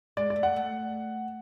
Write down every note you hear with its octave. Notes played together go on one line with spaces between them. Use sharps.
G#3 D5
D5
A3
F#5
A3